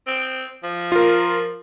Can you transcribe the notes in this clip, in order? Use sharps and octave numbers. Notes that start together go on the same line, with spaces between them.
C4
F3
F4 A#4